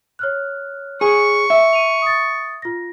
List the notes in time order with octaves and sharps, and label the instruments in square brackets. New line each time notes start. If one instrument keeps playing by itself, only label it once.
[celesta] C#5 F6 F#6
[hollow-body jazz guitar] G#4 [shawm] C#6
[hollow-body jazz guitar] E5
[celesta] D#7 F7
D#6 A6
F4 A#6